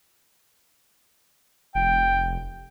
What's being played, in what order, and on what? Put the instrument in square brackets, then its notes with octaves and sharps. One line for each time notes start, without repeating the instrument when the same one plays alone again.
[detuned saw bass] F1 [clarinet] G5